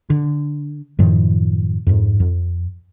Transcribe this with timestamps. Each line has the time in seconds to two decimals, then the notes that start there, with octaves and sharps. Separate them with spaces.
0.10 D3
0.99 F#2 A2 D#3 F3
1.87 F2 G#2
2.20 F2